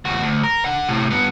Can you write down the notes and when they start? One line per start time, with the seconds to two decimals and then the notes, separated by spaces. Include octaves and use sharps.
0.05 D#2 F#4
0.22 D2
0.44 A#4
0.65 D3 F#5
0.88 A2 C3
1.10 G2 B3